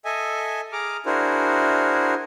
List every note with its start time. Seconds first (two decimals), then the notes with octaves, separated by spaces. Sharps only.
0.05 A4 D#5 E5 G#5
0.72 G#4 A#5 D6 F6
1.06 D4 E4 F#4 G#4 A#4 C5